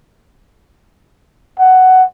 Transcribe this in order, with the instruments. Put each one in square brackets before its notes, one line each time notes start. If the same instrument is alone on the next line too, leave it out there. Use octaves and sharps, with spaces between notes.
[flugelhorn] F#5